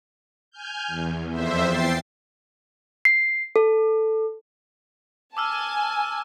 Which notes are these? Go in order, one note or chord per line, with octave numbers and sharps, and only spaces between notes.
G#5 F6 G6
E2
F2 C5 E5
G5 A6 C7
C7
A4
G#5 A5 D6 E6 F6